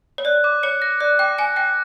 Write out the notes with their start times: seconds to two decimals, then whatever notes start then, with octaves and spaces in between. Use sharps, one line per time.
0.18 C#5
0.25 D5 F#6
0.44 D6
0.63 C#5 C#7
0.82 A#6
1.01 D5 F#6
1.19 G5 D6
1.38 G#5 C#7
1.56 G5 A#6